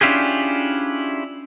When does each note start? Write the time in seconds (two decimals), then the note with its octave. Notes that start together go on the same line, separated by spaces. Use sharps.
0.01 C#4 D4 E4 F4 G4 G#4